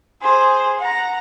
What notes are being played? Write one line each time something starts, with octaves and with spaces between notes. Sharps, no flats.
G#4 C5
F#5 A#5